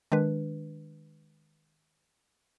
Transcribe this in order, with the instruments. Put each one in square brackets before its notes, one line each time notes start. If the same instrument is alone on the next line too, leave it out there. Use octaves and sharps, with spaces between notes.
[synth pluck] D#3 G#3 D4 B4